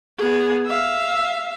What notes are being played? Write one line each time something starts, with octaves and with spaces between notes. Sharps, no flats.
B3 G#4
E5 F5